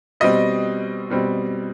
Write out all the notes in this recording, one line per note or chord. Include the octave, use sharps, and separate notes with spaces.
B2 G3 C4 D#5
B2 G3 C4